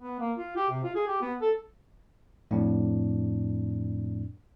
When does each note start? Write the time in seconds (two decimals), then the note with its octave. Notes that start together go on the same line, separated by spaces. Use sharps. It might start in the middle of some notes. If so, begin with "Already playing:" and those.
0.02 B3
0.20 A#3
0.38 F4
0.56 G4
0.70 C3
0.83 F4
0.95 G#4
1.07 G4
1.21 B3
1.41 A4
2.51 F2 A2 D4